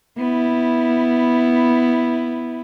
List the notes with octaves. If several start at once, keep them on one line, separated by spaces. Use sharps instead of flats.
B3 E4